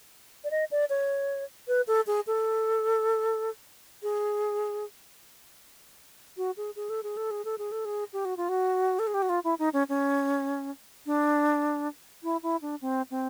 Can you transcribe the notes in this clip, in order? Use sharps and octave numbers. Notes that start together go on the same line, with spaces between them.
D5
D#5
D5
C#5
B4
A4
G#4
A4
G#4
F#4
G#4
G#4
A4
G#4
A4
G#4
A4
G#4
A4
G#4
G4
F#4
F4
F#4
A4
G#4
G4
F#4
F4
E4
D#4
C#4
C#4
D4
E4
E4
D4
C4
C4